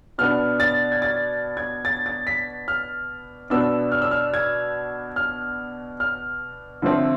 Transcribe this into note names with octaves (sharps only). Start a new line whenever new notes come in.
B2 B3 D4 F6
A6
G#6
A6
G#6
A6
A6
B6
F6
B2 B3 D4 E6
F6
E6
F6
G#6
F6
F6
D3 F3 A3 C4